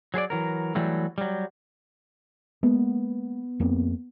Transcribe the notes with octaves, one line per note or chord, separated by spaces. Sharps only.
F#3 G#4 C5 D5
E3 F#3 A#4
E3 F#3 G3 A3
F#3 G3
G#3 A#3 B3
F2 A#3 C4